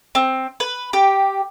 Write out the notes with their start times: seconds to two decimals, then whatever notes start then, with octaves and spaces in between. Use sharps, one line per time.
0.15 C4
0.60 B4
0.93 G4